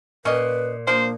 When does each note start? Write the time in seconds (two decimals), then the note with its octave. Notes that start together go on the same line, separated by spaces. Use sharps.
0.25 A#2 C#4 B4 D#5
0.87 F3 A#3 D4 C5